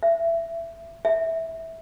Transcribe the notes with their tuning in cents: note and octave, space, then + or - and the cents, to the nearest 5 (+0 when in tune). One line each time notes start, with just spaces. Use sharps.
E5 +20
E5 -15